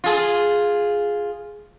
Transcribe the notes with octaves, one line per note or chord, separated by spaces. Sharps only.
F4 G#4